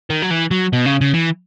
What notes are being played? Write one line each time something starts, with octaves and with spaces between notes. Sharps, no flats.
D#3
F#3
E3
F#3
B2
C#3
C#3
E3